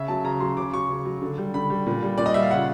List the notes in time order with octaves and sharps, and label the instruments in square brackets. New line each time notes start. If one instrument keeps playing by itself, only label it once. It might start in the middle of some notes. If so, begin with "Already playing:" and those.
Already playing: [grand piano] C#3 E5
F#3 A5
C#3 A#5
F#3 C6
C#3 D6
F#3 C#6
C#3
F#3
D3
G3
D3 B5
G3
A#2
G3
A#2 D5
D#5
G3 E5
F5
C#3 F#5